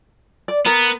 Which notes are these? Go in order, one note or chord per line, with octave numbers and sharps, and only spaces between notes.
D5
B3 A#4